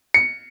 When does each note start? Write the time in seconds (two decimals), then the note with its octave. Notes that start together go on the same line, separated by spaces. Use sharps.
0.14 C#7